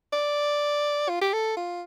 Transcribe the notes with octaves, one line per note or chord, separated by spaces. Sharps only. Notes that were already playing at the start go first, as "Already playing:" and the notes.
D5
F4
G4
A4
F4